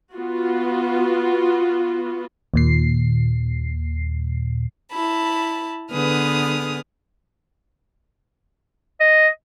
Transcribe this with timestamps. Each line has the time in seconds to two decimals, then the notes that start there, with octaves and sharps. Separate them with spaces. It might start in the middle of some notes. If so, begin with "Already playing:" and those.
0.14 B3 F4 F#4
2.54 D#2 A#2 C7
4.91 E4 A5 B5
5.91 D3 B3 G#4 B4 D#6 F6
9.00 D#5